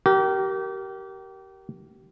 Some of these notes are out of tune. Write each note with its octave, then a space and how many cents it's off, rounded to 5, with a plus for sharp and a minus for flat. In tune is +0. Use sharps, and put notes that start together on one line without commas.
G4 -30 A#4 +0